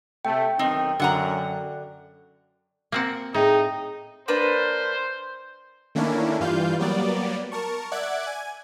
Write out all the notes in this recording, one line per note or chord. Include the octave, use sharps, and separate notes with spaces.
C3 A3 G5
B1 D#3 C4 D#4
F#2 D3 F#5 A#5
A#3 C4 F#5
A2 D#4 G#4 G5
A#3 D4 B4 C5
D#3 A3 A#3 C#4 D4 E4
G2 E3 G3 F4 F5 G6
F#3 G3 A#3 B3 D5
A#4 A5 C#6
D5 E5 F#5 F#6 G#6 D7
G#5 G#6